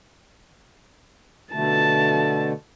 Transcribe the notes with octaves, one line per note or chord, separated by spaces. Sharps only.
B2 D3 A3 A5